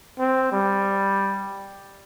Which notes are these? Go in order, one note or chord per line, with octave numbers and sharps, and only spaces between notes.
C4
G3